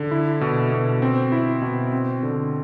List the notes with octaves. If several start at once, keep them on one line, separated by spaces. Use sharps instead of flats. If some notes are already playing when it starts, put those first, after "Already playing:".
Already playing: D3
E4
B2
B2
C4
E4
B2
C4
D3